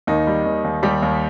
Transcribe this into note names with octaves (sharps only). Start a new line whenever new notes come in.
D#2 D#3 D#4
G3
D#2
D#2
D#2 G3 G4
D#2